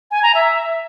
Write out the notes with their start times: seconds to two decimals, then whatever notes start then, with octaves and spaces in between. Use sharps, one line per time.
0.11 G#5
0.23 A#5
0.35 E5